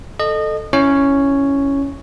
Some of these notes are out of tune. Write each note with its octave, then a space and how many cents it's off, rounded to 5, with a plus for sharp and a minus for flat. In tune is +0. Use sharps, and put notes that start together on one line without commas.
A4 +0 D#5 -25
C#4 +0 E4 +0 C#5 +0